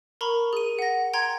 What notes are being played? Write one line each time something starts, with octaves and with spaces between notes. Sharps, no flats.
A#4 A#5 B5 C#6
G#4 D#7
F#5 A#6
G5 A#5 C6 G#6